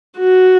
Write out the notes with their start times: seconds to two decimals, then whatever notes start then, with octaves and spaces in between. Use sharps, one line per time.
0.18 F#4